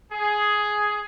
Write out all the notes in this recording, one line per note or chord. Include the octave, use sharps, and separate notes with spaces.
G#4